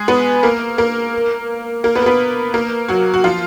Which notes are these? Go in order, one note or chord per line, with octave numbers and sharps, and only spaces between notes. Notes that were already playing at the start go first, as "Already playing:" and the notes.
Already playing: G#3 G#4
B3 B4
A#3 A#4
A#3 A#4
A#3 A#4
B3 B4
A#4
B3 B4
A#3 A#4
F#3 F#4
F#4
F3 F4